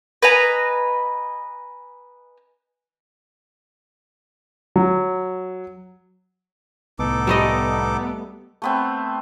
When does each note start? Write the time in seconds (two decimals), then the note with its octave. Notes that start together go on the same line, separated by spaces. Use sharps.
0.22 B4 D#5 G#5 A#5
4.76 F#3
6.99 C2 A2 B3 D#4 A4 D6
7.27 G3 A3 D#5
8.62 A3 B3 C4